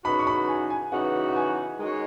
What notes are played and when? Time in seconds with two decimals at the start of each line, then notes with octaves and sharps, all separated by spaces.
0.04 C#3 E3 B3 D#4 F#4 B5
0.19 C#6
0.27 B5
0.48 G#5
0.70 G#5
0.92 C#3 E3 B3 D#4 F#4 F#5
1.29 F#5
1.36 G#5
1.79 D#3 G#3 D#4 F#4 C#5